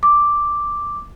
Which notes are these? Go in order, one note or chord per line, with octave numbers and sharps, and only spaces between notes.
D6